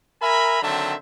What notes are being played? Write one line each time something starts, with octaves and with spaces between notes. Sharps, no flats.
A#4 E5 G#5 A#5 B5
D3 D#3 F#3 C4 E5 A5